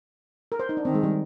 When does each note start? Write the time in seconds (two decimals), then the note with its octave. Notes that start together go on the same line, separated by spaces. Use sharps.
0.52 A#4
0.59 C5
0.69 D#4
0.77 D4
0.85 D#3 C4
0.95 G#3
1.03 G3